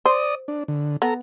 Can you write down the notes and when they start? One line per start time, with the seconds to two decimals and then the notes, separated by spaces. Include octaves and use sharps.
0.06 C5 D5 D#6
0.48 D4
0.68 D3
1.02 B3 A4 A#5